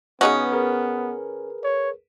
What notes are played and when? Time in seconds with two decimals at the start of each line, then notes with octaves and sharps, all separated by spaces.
0.21 C#3 B3 C#4 D#4 F#4 B4 G#5 D#6
0.52 G#4 A#4 B4
1.64 C#5